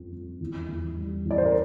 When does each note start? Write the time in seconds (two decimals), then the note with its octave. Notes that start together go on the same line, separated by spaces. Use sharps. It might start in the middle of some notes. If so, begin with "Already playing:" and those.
Already playing: F2 C4
0.12 F2
0.40 E2
0.69 E2
0.96 G3
1.25 E2
1.31 D5
1.38 C5
1.45 A#4